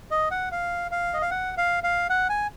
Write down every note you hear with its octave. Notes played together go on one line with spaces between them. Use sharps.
D#5
F#5
F5
F5
D#5
F5
F#5
F5
F5
F#5
G#5